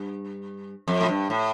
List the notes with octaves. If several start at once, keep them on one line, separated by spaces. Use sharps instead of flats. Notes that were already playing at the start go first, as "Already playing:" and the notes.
Already playing: G2
F2
A2
G2
A2